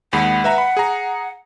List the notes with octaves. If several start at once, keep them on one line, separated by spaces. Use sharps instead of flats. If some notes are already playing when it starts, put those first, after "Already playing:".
D#2 G#3 F#5 B5
B4 E5 A#5
B5
G#4 A#5